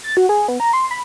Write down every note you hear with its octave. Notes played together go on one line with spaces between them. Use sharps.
A6
F#4
G#4
B3
A#5
C6
B5